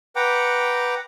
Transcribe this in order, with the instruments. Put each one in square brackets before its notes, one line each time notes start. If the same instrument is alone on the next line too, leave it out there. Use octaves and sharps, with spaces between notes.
[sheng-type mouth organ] B4 F#5 G5 A#5 D6